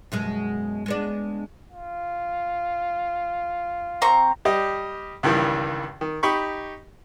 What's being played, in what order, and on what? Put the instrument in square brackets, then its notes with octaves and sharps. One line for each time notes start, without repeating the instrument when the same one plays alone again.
[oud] F#2 B2 G#3
G#3 B3 D4
[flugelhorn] F4
[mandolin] C4 A#5 C#6
[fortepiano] G3 G4 D#5
C#2 G2 D#3 E3 G3
D#3
D#4 G4 B5 C#6